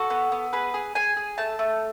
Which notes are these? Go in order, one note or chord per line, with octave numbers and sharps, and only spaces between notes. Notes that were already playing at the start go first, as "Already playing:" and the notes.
Already playing: F#4 A4
B3
B3
G#4 B4
G#4
G#4 G#5
G#4
A3 A5
A3